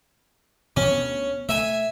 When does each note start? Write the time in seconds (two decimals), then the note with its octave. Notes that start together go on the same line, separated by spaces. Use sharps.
0.77 B2 E3 F3 C#4
0.89 D2 B3
1.49 A3 E5 G#5